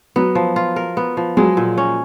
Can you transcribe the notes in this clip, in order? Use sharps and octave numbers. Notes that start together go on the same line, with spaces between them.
F#3 B3
F3
F4
A#4
B3
F3
F#3 G#3
A#2
C#4